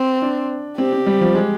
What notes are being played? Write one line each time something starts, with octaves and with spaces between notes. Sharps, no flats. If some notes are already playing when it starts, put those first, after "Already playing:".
Already playing: C4
D4
C4 G4
C4
G3
F3
G#3